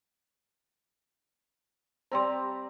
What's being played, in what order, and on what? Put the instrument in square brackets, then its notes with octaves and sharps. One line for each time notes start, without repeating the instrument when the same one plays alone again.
[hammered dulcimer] G3 C4 A#5 [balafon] C5 D5 C6